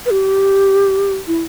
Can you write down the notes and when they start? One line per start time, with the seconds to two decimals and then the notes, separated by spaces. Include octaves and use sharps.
0.06 B4
0.11 G4
1.27 E4